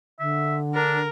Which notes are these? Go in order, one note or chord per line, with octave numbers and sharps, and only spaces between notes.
D3 E5
D4 A#4